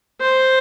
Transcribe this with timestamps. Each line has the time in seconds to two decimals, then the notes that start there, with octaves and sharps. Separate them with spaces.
0.21 C5